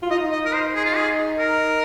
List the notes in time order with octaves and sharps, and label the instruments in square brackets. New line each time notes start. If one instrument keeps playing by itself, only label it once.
[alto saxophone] F4
[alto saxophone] D#4 [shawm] D#5
[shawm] D#5
A#4
C5
G#4
F4
G#4
A#4